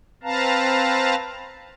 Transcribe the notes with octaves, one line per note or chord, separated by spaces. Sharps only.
C4 B4 F5 A5 A#5